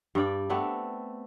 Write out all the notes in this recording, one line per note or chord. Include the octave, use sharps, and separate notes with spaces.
G2 G3 D5 G5
A3 B3 C4 D4